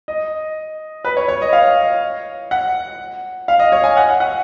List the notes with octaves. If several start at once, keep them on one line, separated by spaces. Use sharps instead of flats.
D#5
B4
C#5
C#5
D#5
F5
F#5
F5
D#5
C#5
G#5
F#5
F#5
F#5